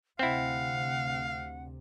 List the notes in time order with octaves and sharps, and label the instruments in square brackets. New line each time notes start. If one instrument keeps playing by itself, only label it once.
[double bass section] D2 C3 [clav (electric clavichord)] C4 E4 [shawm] F5 [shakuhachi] F#5